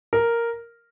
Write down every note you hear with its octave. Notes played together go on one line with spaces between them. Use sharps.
A#4